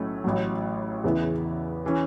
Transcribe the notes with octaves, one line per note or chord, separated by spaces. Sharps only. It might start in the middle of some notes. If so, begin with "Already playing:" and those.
Already playing: B1 A2 F#3 A3 C#4
A1 A2 F#3
E2 C#3 E3 B3 E4
E3 C#4